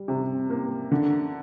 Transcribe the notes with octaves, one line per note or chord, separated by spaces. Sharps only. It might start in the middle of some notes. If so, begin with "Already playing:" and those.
Already playing: G3
C3
A#3
D3